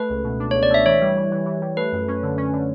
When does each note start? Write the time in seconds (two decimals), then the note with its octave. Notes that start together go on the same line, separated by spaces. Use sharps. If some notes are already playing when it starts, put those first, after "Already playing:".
Already playing: A3 B4
0.10 C#2
0.24 B2
0.40 D4
0.51 C#2 C#5
0.63 D5
0.70 A3 E5
0.85 E3 C#5
1.01 G3
1.16 E3
1.32 E3
1.46 E3
1.62 G3
1.77 A3 B4
1.92 F#2
2.08 C#4
2.23 D3
2.38 C#4
2.53 D3